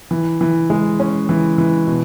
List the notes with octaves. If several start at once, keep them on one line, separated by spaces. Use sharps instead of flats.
E3
E3
G#3
C#4
E3
E3
B2